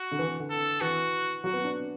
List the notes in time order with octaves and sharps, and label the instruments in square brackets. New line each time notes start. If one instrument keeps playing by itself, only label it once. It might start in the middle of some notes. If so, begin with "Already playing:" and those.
Already playing: [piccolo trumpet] F#4
[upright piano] D3
E3
D3
[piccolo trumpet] A4
[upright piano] E3 [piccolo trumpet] F#4
[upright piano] F#3 [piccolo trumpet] F#4
[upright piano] B3
D4